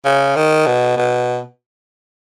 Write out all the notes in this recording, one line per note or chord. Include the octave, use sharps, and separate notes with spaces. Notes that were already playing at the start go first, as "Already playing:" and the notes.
C#3
D#3
B2
B2